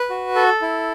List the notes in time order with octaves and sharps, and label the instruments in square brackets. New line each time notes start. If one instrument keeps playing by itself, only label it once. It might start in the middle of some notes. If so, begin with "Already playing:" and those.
Already playing: [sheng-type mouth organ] B4
F#4
A4
E4